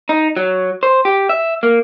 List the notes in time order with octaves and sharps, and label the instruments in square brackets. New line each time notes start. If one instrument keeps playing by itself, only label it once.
[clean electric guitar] D#4
F#3
C5
G4
E5
A#3